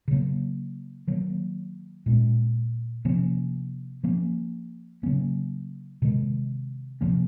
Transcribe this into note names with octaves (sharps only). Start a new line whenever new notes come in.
C#3 F#3 A#3
D#3 F#3 A#3
A#2 G#3 C#4
C3 F3 A#3 C#4
F3 A#3 C#4
C#3 F#3 A#3 C#4
C3 D#3 G#3
C3 F3 A#3 C#4